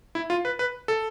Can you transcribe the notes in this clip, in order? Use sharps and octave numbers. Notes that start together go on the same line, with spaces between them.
E4
F4
B4
B4
A4